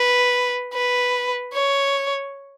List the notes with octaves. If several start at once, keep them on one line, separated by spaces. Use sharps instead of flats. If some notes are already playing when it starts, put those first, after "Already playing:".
Already playing: B4
B4
C#5